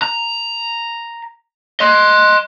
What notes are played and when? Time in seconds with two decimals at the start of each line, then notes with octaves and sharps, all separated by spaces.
0.02 A#5
1.80 D#5 C6